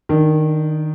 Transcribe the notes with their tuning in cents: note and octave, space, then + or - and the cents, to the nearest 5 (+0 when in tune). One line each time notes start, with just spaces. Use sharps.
D#3 -5 D4 +20